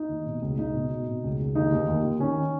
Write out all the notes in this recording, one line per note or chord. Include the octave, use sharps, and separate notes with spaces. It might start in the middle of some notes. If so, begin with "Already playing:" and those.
Already playing: D#4
D#2
B2
C#2
C#2 D#4
B2
B2
B2
C#2
C#2
D#2 D#4
D#2
D#2
D#3
D#3 C#4